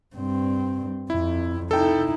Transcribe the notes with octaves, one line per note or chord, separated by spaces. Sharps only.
G2 C4
F2 E4
D#4 E4 A4 G5